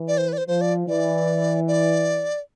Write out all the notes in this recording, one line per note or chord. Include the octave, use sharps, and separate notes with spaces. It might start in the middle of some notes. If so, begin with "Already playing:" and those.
Already playing: E3
D5
C5
B4
D5
C5
F3 C5
D5
E3 D5
D5